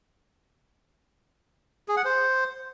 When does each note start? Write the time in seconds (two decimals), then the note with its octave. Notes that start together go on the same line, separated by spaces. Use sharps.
1.88 G#4
1.97 F#5
2.05 C5